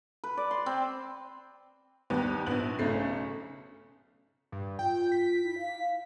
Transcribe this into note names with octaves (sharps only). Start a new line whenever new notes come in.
B4
D5
C6
C4
D#2 D#3 G3 B3
A#1 B3 F#7
B1 C#3 A3 C7
G2
F4 G5
B6
E4
F5